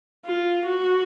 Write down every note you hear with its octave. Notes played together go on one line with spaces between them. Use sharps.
F4
F#4